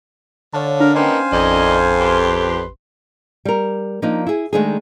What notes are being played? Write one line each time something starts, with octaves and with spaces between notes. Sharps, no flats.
D3 C#5 F5 A5
D4 A#4 A#5
A#3 B3 C#4 D#4 C5 F5 G5 G#5
A1 F2 D#3 D5 D#5
G4 B4 C6
G3 A#4
F3 A#3 D4 D#4
E4 G#4
D#3 G#3 A3 D4 D#4 G#4